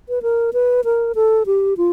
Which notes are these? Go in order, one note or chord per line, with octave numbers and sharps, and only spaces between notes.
B4
A#4
B4
A#4
A4
G4
F4